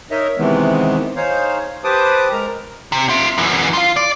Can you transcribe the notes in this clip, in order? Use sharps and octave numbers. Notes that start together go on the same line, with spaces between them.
D#4 A#4 C#5 D#5 E5
C3 D#3 E3 G#3 B3
D#4 G#4 C5 C#5 F5
G4 B4 C5 A5 D6 D#6
G#3 A#4 A#5
C3
F4 E5
F#2 E3
F4 F5
D5